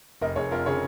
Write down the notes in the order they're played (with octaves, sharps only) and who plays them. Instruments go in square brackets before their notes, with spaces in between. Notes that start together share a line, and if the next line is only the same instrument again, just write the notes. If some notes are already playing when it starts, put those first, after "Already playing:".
[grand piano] F1 A#4 D#5
F1 G#4 C#5
F2 F4 A#4
C#3 G#4 C#5